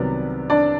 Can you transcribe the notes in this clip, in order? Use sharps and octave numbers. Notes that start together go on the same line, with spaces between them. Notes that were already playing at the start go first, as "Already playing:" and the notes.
Already playing: C2 C3 D#3 F#3 B3 D5
D4 D5